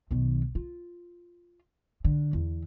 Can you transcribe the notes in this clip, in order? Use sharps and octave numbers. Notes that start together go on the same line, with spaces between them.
B1 D#3
F4
D3
E2